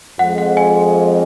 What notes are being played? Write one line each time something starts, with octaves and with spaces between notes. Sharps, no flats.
F2 F3 G#3 F#5
F#5
G#5